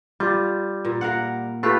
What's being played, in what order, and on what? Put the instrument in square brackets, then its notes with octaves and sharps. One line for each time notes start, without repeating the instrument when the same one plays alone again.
[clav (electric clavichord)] G3 [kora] F4
[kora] A#2
A#4 F5 F#5
[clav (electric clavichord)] A3 F4 G4 [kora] B4